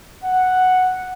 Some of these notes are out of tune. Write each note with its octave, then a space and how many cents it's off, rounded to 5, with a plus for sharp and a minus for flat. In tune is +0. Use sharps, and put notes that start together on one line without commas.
F#5 +0